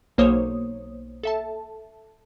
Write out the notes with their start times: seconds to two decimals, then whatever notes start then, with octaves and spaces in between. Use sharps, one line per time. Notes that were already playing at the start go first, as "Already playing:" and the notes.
0.18 B1 A#3 C5 C#5 D#6
1.23 A4 E5 A5